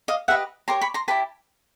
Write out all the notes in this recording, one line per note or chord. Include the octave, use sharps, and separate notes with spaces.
D#5 F5
G4 B4 D#5 E5 F#5
G4 A#4 C#5 A#5 C6
B5 C#6
A#5 C6
E4 G4 B4 A5 B5